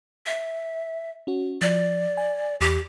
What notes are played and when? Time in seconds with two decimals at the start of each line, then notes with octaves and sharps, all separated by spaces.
0.26 E5
1.27 C#4 F#4
1.62 F3 D5
2.17 G#5
2.61 E2 G4